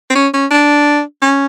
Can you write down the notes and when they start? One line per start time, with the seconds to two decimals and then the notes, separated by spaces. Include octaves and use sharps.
0.10 C4
0.15 C#4
0.34 C#4
0.51 D4
1.22 C#4